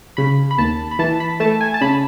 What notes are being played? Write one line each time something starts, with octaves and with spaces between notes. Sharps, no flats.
C#3 B5
B5
D#2 A5
B5
E3 A5
B5
A3 A5
G#5
A5
C#3 B5